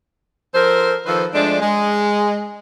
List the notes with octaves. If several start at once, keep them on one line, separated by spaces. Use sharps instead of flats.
F3 A4 A#4 C5
D#3 F3 A4 B4 C5
F3 G#3 A3 D4
G#3